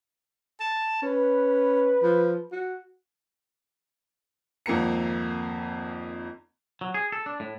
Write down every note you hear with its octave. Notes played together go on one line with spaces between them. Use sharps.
A5
C#4 B4
F3
F#4
G#1 F2 A#3 A#5 C#7
F#3
G#4
A4
D4
A2